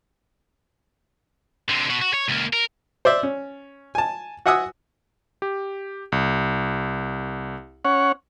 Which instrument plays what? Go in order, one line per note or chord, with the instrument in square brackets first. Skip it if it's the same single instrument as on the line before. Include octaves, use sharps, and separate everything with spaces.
[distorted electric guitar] D3 C4
B2 F#4
F#4
C#5
C#2 A#3
A#4
[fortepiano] C5 D5 E5
C#4
G#5 A5
F#4 E5 F#5 G#5 D#6 E6
[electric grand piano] G4
C2
[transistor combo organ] C#4 C#5 F#5